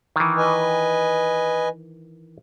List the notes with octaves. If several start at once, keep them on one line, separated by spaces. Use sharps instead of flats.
D#3 E3
B4 D#5 G#5